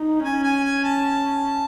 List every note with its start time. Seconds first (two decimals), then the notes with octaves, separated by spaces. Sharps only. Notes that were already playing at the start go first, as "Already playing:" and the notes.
Already playing: D#4
0.24 C#4 G#5
0.43 G#5
0.64 G#5
0.84 A5